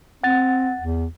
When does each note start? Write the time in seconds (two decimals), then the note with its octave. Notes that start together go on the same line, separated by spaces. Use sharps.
0.23 C4 F#5 A6
0.80 E2